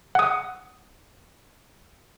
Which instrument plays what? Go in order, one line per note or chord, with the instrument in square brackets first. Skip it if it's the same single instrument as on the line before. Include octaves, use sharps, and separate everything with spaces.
[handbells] F#5 D#6